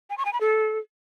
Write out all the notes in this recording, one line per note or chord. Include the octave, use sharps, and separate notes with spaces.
G#5
C#6
G#5
B5
A4